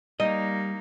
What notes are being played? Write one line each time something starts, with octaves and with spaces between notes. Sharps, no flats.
G3 A#3 D#4 D#5